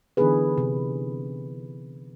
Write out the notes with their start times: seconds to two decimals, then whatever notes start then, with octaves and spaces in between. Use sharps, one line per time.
0.17 D3 E3 B3 D#4 G#4 B4
0.58 C3